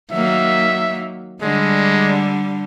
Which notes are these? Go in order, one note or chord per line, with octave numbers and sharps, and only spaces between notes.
D#3 F#3 A#3 E5
D3 G3 G#3